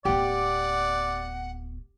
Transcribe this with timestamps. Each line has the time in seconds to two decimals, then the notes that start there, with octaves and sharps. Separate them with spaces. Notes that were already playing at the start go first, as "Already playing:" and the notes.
0.05 D1 B3 G4 D5 F#5